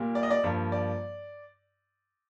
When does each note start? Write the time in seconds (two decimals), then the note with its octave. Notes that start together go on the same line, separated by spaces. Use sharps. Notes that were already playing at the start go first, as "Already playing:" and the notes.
Already playing: A#2 G3 A#3
0.15 D5
0.23 D#5
0.30 D5
0.44 G2 F3 A#3
0.72 D5